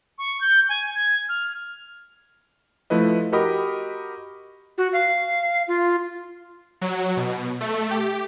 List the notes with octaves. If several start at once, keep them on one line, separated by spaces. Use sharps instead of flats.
C#6
G6
G#5
G#6
F6
F3 A3 E4 B4 D#5
F#4 G4 A#4 D#5 B5 D#6
F#4
F5
F4
F#3
B2
A3
G4